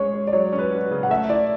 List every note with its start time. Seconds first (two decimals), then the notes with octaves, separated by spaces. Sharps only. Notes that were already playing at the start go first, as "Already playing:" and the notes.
Already playing: G#3 C#4 G#4 C#5
0.14 G#3
0.27 D5
0.33 F#3 C#5
0.52 C#4
0.58 B4
0.71 F#4
0.91 C#3
1.03 F#5
1.10 A3 E5
1.30 E4 D5